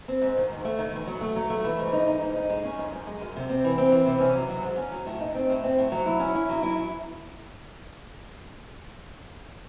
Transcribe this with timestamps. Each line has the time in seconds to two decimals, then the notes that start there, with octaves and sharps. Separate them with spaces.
0.08 C4
0.21 G#2
0.37 D#3
0.50 G#2
0.65 A3
0.78 D#3
0.93 E2
1.07 F#3
1.21 A3
1.36 F#3
1.50 A3
1.64 E3
1.79 G#2
1.93 D#4
2.07 D#4
2.21 G#2
2.35 D#4
2.49 G#3
2.65 C#4
2.78 F#2
2.92 F#2
3.07 G#3
3.21 F#2
3.36 C3
3.50 C4
3.64 E3
3.78 C4
3.92 E3
4.06 C3
4.20 C#4
4.35 F#3
4.50 F#3
4.63 G#2
4.78 C#4
4.92 F#3
5.06 A2
5.21 D#4
5.34 C4
5.50 A2
5.64 C4
5.78 A2
5.92 F#3
6.06 E4
6.20 C#4
6.35 E4
6.49 F#3
6.63 E4